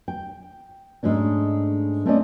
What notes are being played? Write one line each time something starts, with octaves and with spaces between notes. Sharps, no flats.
G5
G#2 G#3 A3 C#4 D4
A3 C4 C#4 D5 D#5